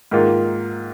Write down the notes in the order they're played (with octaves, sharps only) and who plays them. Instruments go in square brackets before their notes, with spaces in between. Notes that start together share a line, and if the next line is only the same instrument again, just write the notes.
[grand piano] G#2 D#3 A#3 F4